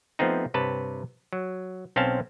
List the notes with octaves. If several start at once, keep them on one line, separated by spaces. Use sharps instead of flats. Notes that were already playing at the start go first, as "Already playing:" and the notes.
F3 A3 B3 C4 D#4
G2 C3 B4 C#5 A5
F#3
B1 C4 C#4 C5 F5 A5